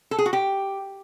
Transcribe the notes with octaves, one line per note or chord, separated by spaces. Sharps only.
A4
G#4
F#4
G4